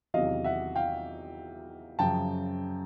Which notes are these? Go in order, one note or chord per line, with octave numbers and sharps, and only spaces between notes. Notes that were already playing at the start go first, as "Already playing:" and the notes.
E2 C3 D#3 F#3 D#5 F5
E5 F#5
F5 G5
F#2 C#3 F3 G5 A5